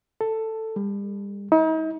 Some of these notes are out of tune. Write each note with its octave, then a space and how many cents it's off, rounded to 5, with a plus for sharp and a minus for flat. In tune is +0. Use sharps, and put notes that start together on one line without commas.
A4 +10
G3 +40
D#4 +40